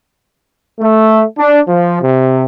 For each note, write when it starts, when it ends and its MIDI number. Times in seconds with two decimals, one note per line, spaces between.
0.80 1.22 57
1.38 1.60 62
1.68 1.99 53
2.02 2.45 48